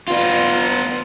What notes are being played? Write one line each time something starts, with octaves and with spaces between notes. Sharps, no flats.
B3 F4